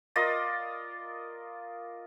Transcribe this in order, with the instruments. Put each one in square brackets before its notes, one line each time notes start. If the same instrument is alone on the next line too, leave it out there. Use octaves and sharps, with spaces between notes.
[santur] F4 A#4 D5 D#5